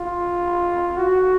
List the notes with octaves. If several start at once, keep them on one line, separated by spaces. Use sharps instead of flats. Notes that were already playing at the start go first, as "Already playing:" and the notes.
Already playing: F4
F#4